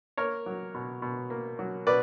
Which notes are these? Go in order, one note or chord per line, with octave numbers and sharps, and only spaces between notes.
A#3 A#4 C#5
F#3
B2
B2
A#3
F#3
B2 B4 D5